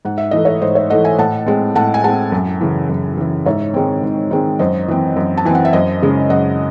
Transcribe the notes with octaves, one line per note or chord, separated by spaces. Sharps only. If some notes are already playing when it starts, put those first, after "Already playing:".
G#2 F#5
E5
E3 A3 D#5
C#5 E5
G#2 C5 D#5
C#5 E5
E3 A3 D#5 F#5
E5 G#5
A2 F#5 A5
G#3 C4
A2 F#5 A5
G#5
G#3 C4 F#5 A5
F#2
C#3 E3
F#2
C#3 E3
G#2 C#5 E5
D#3 G#3 C4
G#2
D#3 G#3 C4
F#2 C5 D#5
E3 C4
F#2
A5
E3 C4 G#5
F#5
E5
F#2 C5 D#5
C#3 G#3 C#4
F#2 D#5 F#5